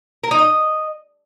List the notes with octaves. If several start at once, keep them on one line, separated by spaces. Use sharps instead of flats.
A#4
D#4
D#5